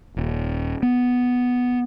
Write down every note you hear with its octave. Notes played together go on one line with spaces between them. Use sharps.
D#1
B3